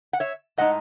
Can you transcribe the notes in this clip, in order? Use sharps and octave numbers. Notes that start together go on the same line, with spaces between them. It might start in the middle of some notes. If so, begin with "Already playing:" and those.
F#5
C#5 E5
A2 G#3 D#4 D#5 F#5